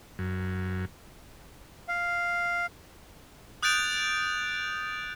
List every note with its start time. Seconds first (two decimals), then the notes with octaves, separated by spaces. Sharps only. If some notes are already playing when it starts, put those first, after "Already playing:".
0.19 F#2
1.89 F5
3.63 D#6 F#6 G6 A6 D7 F7